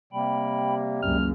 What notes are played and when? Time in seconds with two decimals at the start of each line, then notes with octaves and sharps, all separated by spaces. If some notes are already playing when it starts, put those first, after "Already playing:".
0.13 C3 G3 A#3 G5 B5
1.02 C#2 F#2 A#3 C#4 F6